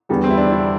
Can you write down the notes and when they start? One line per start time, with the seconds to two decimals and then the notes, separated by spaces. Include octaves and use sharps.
0.09 E2 D3 G3 B3
0.24 C4
0.30 E4
0.37 D4
0.51 E4